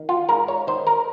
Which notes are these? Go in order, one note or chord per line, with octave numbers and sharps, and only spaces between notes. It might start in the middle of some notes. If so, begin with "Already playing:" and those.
Already playing: D#3
F4
G#2 A#4
C#5
D#3 C5
A#4